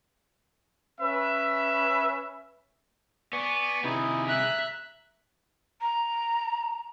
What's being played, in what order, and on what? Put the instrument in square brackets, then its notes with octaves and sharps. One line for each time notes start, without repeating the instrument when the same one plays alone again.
[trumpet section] C#4 B4 E5
[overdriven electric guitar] B3 [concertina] D5 G#5 C#6
[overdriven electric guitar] C3 G#4 [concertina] D#4 E4
[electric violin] E5 F#6 [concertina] A#5
[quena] A#5